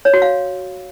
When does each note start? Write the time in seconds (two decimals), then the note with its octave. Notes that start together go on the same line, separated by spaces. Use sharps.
0.05 C#5
0.14 F#4
0.22 F5